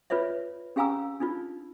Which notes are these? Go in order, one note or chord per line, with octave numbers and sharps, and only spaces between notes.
F4 B4 C#5 D5 E5
C#4 G4 F5 G#5 A#5 E6
D4 D#4 F4